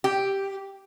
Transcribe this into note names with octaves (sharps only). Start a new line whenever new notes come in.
G4